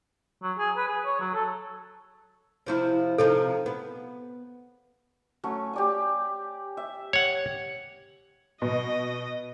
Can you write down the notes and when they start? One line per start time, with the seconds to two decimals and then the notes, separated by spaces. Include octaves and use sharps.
0.43 F#3
0.58 G#4
0.77 B4
0.88 G#4
1.05 C#5
1.20 F#3
1.34 A4
2.66 C3 F3 E4
3.18 C3 F3 D#4 A4
3.66 B3
5.44 F#3 A3 C#4
5.73 G4 D5 G#5
6.77 E5
7.13 C#5 F#5
8.62 B2 D#5